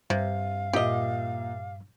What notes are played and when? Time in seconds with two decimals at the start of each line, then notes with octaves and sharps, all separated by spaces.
0.10 G2 C3 F5
0.73 A#2 G4 D#5 E5